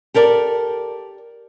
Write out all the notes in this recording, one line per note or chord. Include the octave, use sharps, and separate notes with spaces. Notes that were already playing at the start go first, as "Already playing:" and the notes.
G4 A4 A#4 D5